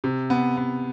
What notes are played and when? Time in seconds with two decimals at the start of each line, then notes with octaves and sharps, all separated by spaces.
0.04 C3
0.30 B3
0.57 B3